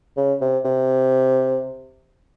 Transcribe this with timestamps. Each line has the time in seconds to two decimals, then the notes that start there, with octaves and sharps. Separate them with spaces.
0.17 C#3
0.41 C3
0.65 C3